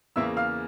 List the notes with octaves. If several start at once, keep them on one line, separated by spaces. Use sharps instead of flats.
E2 C#3 E3 A#3 E5 E6
F5 F6